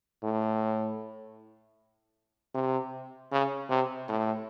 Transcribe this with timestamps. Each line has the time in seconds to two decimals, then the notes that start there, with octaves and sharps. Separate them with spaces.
0.23 A2
2.55 C3
3.32 C#3
3.70 C3
4.09 A2